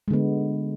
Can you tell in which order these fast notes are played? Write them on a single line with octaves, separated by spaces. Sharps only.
G#3 D3 B3